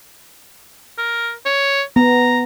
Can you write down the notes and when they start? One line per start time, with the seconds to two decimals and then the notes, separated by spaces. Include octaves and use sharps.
0.98 A#4
1.46 C#5
1.96 B3 A#5